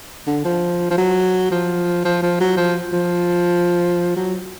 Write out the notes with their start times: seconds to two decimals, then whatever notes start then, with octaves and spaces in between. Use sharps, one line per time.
0.27 D3
0.44 F3
0.91 F3
0.98 F#3
1.51 F3
2.05 F3
2.22 F3
2.40 F#3
2.57 F3
2.92 F3
4.16 F#3